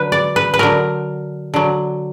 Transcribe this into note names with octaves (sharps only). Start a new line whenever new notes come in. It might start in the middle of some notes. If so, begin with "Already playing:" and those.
Already playing: D3 F#3 B4
D5
B4
B4
D3 F#3 A#4
D3 F#3